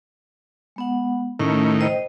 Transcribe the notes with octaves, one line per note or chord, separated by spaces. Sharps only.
G#3 B3 F#5
A2 D#3 A3 C#4
C5 D#5 G5